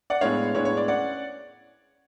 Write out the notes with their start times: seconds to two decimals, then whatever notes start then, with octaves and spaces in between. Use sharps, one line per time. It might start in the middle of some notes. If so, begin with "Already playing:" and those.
0.10 D5 F#5
0.21 A2 G#3 B3 D4 C#5 F5
0.55 A2 G#3 B3 D4 C#5
0.65 C#5
0.77 D5
0.88 C#4 D5 F#5